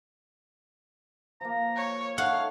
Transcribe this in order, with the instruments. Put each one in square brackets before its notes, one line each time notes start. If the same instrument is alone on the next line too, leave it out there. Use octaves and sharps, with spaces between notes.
[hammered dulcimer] F3 A#3 [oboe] A#5
[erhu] C#5
[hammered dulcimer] D#4 E4 A4 [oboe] C#5 [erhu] F5 [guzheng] F#5